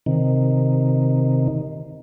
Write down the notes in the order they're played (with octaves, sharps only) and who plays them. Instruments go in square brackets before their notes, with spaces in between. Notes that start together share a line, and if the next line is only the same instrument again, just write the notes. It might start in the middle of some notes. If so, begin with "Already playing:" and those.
[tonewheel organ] C3 D#3